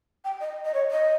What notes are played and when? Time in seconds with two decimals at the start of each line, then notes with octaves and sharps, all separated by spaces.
0.25 G5
0.41 D#5
0.65 D#5
0.74 C#5
0.91 D#5